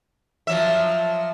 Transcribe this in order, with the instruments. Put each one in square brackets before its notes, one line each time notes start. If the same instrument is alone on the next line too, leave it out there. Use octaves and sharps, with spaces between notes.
[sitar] F3 F#3 E5